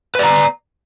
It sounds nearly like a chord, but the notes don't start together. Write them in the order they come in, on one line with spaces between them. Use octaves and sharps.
B4 D5 A#5